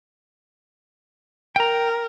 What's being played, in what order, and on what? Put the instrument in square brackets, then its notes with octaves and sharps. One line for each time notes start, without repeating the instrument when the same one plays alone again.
[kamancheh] A#4 [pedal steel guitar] G5 A#5